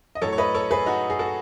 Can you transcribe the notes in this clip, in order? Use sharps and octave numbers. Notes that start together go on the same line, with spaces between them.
D#5
A2 F#3 A4 C#5
C#5
B4 D#5
A4 C#5
G#4 B4
D#4 F#4
G#4
F#4 A4